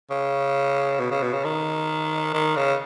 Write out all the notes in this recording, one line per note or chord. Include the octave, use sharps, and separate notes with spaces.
C#3
B2
C#3
B2
C#3
D#3
D#3
C#3